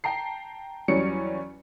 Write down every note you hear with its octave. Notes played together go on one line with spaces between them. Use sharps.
G5 A5 A#5 C7
E2 F#3 G3 C#4 C#7